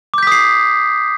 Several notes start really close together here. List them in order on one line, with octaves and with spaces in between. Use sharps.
D6 G6 B6 D#6 C7